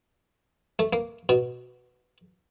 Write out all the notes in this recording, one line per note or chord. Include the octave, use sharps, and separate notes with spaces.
A3
A#3
B2